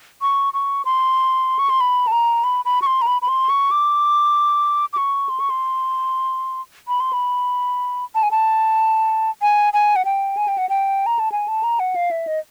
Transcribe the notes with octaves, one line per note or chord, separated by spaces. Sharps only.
C#6
C#6
C6
C#6
C6
B5
A5
A#5
B5
B5
C#6
C6
A#5
B5
B5
C6
C#6
D6
D6
C#6
C6
C#6
C6
B5
C6
B5
A5
G#5
A5
G#5
G#5
F#5
G5
G#5
G5
F#5
G5
A#5
A5
G#5
A5
A#5
F#5
F5
E5
D#5